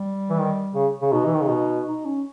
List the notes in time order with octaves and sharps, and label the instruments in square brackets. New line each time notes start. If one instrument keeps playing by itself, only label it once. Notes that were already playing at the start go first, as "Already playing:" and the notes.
Already playing: [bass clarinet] G3
[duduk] E3
D#3
C#3
C#3
[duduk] B2 [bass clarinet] D#4
[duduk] E3
D#3
C#3
B2
[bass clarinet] D#4
C#4